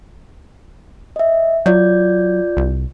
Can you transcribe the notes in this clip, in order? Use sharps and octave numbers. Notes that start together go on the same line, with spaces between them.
D#5 E5
F#3 F4 D5 G6
C2